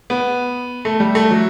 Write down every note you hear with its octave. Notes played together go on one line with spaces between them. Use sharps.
B3
A3
G3
A3
F#3